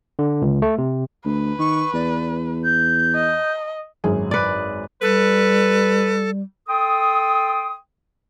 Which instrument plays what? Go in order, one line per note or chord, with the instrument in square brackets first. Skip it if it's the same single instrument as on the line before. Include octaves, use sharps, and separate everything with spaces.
[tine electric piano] D3
C#2
A3
C3
[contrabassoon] D2 [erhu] B4
[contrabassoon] D#3 [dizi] C#6
[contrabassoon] E2 [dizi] D5
[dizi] G6
[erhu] D#5
[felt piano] G#1 F#2 G#4
[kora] B4 D5
[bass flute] G3 [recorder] A4 [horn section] B4
[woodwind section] A4 G5 C6 D#6